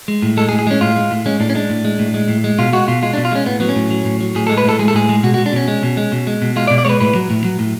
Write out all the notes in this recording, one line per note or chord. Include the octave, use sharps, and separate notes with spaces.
G#3
A2
G#3 A4
G#4
A2
G#4
G#3 C#4
A2 F4
G#3
A2
G#3 C#4
A2 D4
C#4
G#3 D4
A2
G#3
A2
G#3
A2
G#3
B2 F4
G#3 F#4
B2 F4
G#3 F4
D4
B2
F4
G#3 C#4
A2 B3
F#3 B3
C#4
A2
F#3
A2
F#3
A2 G#4
A4
G#3
B4
A2 A4
G#3 G#4
A4
A2 G#4
G#3
B2 F#4
F#4
G#3
D4
B2 C#4
G#3
B2
G#3
B2
G#3
B2
G#3 F4
D5
B2
D5
G#3 B4 C#5
A2 B4
F#3
A2
F#3
A2